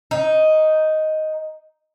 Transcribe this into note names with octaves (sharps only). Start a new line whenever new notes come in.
D#4